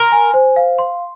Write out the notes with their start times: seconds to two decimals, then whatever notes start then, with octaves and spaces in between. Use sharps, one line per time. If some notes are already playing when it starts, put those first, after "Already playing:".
Already playing: A#4 C6
0.12 G#5
0.34 C5
0.56 F5
0.79 C6